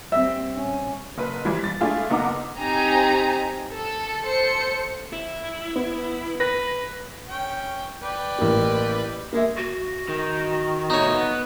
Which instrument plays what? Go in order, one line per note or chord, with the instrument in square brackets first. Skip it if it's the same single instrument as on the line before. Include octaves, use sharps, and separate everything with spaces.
[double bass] G3 C4 [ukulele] E5
[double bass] C#4
[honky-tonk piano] F#1 B4
E3 F3 G3
A6
G#3 A3 D4 E4 F4 G#4
F#1 B3 D#4 F#5 A#5 D6
[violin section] C4 D#4 G4 G#5 A#5
A4
A4 C5 C#7
[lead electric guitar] E4
[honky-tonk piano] B3
[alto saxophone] B4 [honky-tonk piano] A#6
[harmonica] C#4 G5
B4 D5 G5
[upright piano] A1 E3 A#3
[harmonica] G#3 [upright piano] A#3 E5
[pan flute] F#4
[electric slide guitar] D#3
[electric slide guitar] B2 A3 [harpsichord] D#4 C#5
[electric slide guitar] B3